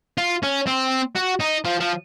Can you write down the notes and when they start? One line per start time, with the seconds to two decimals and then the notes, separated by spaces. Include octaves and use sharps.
0.18 F4
0.43 C#4
0.67 C4
1.16 F#4
1.40 D#4
1.65 F3
1.80 F3